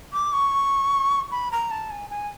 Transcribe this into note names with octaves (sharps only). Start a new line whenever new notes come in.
D6
C#6
B5
A#5
A5
G#5
G#5